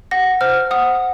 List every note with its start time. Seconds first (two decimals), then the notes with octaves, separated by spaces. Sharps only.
0.11 F#5 A#6
0.41 C5 F6
0.71 F#5 D#6